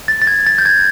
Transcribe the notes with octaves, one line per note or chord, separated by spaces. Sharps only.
A6
A6
G#6
A6
G6
G#6